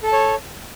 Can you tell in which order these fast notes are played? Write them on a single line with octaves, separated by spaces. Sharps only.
A4 A5 C#5